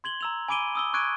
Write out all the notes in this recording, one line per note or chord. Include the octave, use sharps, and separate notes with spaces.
C6 G#6 F#7 G7
A#5 E6 F7
G#5 B5 D6 D7 D#7 G7
D#6 E6 G7
C#6 D6 F#6 G#6 D7 D#7